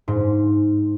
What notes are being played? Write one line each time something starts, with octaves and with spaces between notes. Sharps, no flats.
G#2